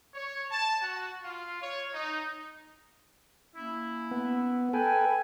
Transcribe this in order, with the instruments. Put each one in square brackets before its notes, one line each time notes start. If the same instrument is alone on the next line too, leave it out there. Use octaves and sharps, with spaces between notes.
[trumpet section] C#5
A5
F#4
F4
C#5
D#4
[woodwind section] A#3 C#4 E4
[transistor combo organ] B3
[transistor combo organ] A4 B4 [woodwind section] G5 G#5